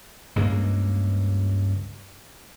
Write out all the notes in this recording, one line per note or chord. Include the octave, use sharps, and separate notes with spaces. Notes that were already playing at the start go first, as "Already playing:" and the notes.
C#2 G2 G#3 A#3